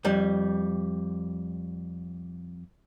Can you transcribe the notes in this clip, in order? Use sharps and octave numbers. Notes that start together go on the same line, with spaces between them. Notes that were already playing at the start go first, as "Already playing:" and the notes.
F2 G3